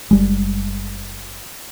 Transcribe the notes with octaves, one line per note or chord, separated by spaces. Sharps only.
F#1 G3 G#3